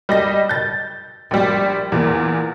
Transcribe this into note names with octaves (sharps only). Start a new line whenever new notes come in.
G3 D#5 A#6
G6 A6
A#1 G3
E2 A#2